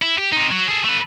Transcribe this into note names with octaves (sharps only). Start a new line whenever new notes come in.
E4
G4
C3 D#4
F#3
G#4 A4
A3 B4